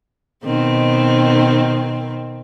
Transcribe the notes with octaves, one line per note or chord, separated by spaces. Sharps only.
B2 D#3 C4